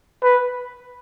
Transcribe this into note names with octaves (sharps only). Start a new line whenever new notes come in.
B4